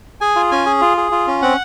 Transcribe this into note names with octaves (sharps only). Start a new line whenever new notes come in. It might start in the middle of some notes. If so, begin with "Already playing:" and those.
G#4 G#5
F4
C#4 G#5
G#4
F4
G#4
F4
C#4
C4 F#5